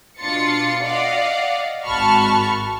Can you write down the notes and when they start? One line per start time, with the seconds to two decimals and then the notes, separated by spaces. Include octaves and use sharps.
0.20 B2 D4 F4 C6 A6 C#7
0.84 D5 D#5 F5 F#5
1.85 G#1 F#4 A5 B5 C#6 F6